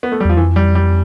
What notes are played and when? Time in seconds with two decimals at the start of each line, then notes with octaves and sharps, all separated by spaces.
0.03 B3
0.12 A3
0.20 G3
0.25 E2 F3
0.37 F2 E3
0.56 G3
0.75 G3